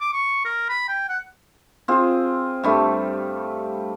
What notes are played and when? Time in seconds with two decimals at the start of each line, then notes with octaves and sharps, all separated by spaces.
0.01 D6
0.13 C#6
0.45 A#4
0.69 B5
0.89 G5
1.09 F#5
1.88 C4 F4 G#4
2.64 G2 G3 A3